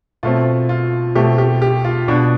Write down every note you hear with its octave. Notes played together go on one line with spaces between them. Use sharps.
B2 A3 C4 F4
F4
B2 A3 C4 G4
G4
G4
F4
B2 B3 D4